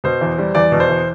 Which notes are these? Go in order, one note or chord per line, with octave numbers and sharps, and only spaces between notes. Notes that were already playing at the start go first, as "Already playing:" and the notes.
B2 C5
E2
G3
E2 D5
B2
C5
E2